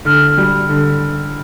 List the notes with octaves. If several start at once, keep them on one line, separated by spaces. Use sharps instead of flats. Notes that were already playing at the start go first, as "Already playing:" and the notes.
D3 F6
G3
D3